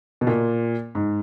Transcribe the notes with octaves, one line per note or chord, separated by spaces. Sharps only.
B2
A#2
G#2